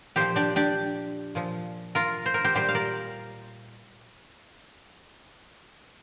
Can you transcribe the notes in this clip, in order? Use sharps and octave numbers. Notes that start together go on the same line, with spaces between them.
A#2 F3 G4 C5
D4 G4
D4 G4
A#2 F3
F4 A#4
C5
A#4
G4 C5
A#2 G3 G4 C5
F5
A#4 D5